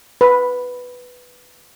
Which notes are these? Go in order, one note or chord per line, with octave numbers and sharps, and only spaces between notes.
B4